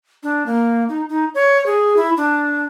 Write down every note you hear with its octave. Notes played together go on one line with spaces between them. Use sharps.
D4
A#3
D#4
D#4
C#5
G#4
E4
D4